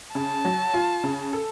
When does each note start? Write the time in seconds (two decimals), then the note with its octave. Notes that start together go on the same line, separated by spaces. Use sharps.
0.15 C#3 A5
0.45 F#3
0.74 F4
1.04 C#3
1.33 A4